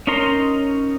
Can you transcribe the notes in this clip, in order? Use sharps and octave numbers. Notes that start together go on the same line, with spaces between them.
C#4 D#4 A#4 A#5 C6